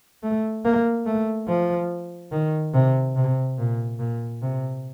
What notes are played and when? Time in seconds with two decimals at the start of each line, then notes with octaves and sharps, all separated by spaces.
0.23 A3
0.65 A#3
1.06 A3
1.48 F3
2.32 D#3
2.74 C3
3.16 C3
3.58 A#2
3.99 A#2
4.42 C3